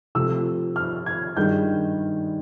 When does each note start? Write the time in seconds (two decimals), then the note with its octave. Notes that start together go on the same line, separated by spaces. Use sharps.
0.15 C3 F3 A3 E6
0.76 F6
1.06 G#6
1.37 G2 D#3 G#3 G6